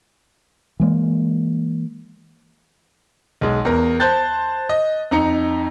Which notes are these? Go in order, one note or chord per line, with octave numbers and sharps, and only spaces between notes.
E3 G#3 A#3
B1 G#3
E2 A#4
C5 A5 F#6 G6 A6
D#5
F2 D#4 A#5 C#7